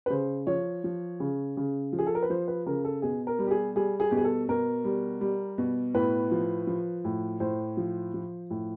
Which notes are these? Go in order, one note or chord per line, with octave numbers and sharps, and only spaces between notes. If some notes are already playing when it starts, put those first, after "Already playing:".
B4
C#3 C5
F3 C#5
F3
C#3
C#3
F3
G#4
A4
A#4
B4
F3 C5
B4
C#3 A#4
A4
B2 G#4
A#4
G3
G4
G#4
G3 G#4
G#4
B2 G4
G#4
A4
B2 A#4
G3
G3
B2
A2 B4
F3
F3
A2
A2 C5
F3
F3
A2